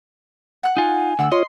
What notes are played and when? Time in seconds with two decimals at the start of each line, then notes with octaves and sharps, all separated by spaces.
0.63 F#5 F#6
0.77 D#4 F4 G#5
1.19 D2 D3 F#5 E6
1.31 F4 C#5 D#5 C6